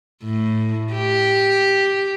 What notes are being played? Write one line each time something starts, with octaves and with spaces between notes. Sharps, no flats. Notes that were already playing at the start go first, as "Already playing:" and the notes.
A2
G4